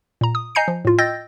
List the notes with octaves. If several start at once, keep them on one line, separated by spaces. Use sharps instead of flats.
A#2 A#5
D#6
D#5 G#5 A#5 G6 C7 C#7
F3
A2 F4
D#5 G5 E6 G6 A6 A#6